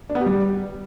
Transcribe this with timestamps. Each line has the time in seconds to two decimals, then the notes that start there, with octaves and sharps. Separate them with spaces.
0.10 D4
0.15 B3
0.21 G4
0.26 G3